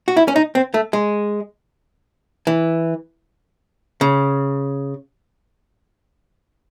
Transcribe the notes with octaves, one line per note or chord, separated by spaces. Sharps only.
F#4
E4
C#4
D#4
C4
A3
G#3
E3
C#3